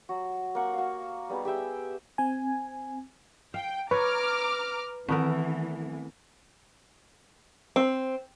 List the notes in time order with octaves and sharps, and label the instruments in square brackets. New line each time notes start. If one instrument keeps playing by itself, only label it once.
[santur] F#3 F#4
A#3 F#5 C#6
F#4 F5
G3 B3 D#4 G#4
G4 G#4 E5 G5
[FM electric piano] C4 G#5
[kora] F5 [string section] G5
[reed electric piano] B4 [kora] C#5 [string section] A#5 D6 F6
[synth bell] D#3 C4 [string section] E3 [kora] A3 B3 A#4
[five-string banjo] C4